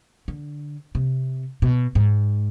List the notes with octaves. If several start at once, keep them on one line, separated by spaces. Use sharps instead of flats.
D3
C3
B2
G#2